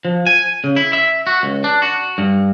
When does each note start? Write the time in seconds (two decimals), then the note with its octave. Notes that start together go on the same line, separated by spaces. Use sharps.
0.05 F3
0.27 G#5
0.64 C#3
0.76 E4
0.93 E5
1.27 F#4
1.43 C#2
1.64 D4
1.82 F#4
2.18 G2